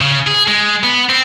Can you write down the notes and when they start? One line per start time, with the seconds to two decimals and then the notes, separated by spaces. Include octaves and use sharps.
0.01 C#3
0.27 G#4
0.48 G#3
0.83 B3
1.09 C4